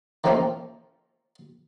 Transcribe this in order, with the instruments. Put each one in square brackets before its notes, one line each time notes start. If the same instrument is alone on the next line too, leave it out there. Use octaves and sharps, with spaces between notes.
[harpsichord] D#3 F3 A3 A#3 C4 C#4